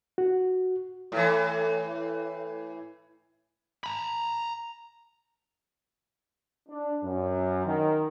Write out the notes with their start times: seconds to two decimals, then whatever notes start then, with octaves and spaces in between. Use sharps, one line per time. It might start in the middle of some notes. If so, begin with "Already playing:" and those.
0.18 F#4
1.12 A2 E3
3.84 A#5 B5
6.69 D4
7.04 F#2
7.65 D#3